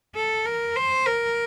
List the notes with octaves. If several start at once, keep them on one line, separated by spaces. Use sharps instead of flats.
A4
A#4
C5
A#4